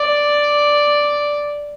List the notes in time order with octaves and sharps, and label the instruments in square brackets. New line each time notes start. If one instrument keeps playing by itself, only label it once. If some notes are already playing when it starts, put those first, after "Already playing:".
Already playing: [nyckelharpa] D5